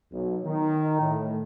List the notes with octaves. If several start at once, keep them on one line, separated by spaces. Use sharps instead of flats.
B1
D#3
A2